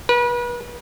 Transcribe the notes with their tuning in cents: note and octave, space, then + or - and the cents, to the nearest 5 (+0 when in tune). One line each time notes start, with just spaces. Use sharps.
B4 -35